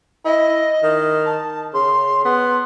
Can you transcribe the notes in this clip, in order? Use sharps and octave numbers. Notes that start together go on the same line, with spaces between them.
E4 D#5
D#3
A5
C#3 C6
B3 C6